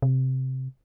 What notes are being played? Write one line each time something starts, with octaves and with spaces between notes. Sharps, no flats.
C3